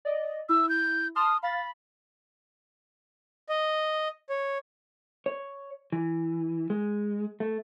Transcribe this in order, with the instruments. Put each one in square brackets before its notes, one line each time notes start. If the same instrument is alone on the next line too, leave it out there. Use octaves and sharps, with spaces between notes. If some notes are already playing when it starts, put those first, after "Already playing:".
[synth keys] D5 D#5
[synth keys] E4 [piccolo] E6
[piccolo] G6
[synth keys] A5 C6 F6 [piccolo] D#6
[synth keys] F5 A6 [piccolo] B5
[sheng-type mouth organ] D#5
C#5
[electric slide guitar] C#5
E3
G#3
A3